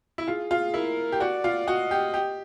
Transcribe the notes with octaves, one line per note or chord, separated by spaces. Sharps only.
E4
F4 G#4
F4
E4 A#4
G4
F#4 D5
F4
F#4 D#5
G4
G4